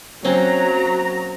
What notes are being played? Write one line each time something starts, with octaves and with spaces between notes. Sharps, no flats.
F#3 A#3 C4 C#4 A#5